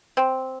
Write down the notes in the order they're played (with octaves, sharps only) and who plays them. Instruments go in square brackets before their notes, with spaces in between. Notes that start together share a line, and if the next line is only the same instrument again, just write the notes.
[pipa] C4